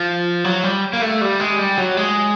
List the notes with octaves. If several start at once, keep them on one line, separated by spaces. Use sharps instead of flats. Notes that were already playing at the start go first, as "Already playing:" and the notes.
Already playing: F3
F#3
G3
A#3
A3
G3
G#3
G3
F#3
G#3